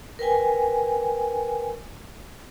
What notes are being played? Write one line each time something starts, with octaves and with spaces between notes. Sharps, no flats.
A#4 B4 G5 G#5